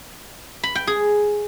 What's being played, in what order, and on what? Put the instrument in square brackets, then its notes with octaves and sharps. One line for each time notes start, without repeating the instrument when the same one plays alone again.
[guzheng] B5
G5
G#4